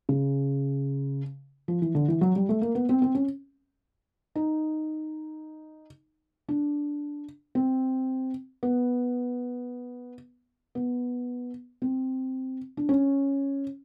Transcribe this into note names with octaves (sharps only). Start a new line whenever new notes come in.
C#3
F3
E3
D3
E3
F#3
G3
A3
A#3
B3
C4
C4
C#4
D#4
D4
C4
B3
B3
C4
D4
C#4